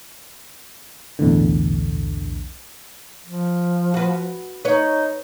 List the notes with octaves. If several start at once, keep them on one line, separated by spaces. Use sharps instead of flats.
B1 E2 A2 D3
F3
F#4 B4
D#4 B4 C#5